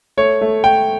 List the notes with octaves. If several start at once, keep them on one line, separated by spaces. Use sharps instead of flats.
A3 C#5
A3
A3 G5